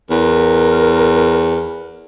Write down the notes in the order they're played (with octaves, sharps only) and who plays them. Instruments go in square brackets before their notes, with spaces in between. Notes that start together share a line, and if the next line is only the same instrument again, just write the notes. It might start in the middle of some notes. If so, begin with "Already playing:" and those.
[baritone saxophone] E2 [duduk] A#4